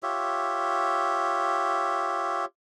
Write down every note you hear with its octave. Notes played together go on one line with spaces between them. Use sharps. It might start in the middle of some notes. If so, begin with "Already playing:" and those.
F4 G4 C#5 E5